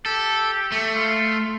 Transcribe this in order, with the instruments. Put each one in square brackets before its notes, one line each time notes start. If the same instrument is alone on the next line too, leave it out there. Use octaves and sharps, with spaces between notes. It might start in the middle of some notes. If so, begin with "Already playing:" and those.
[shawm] G4 [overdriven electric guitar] A4
[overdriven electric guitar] A3
[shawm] F4